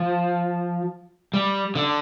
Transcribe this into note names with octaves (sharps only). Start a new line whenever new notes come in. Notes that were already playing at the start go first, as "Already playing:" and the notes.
Already playing: F3
G3
D3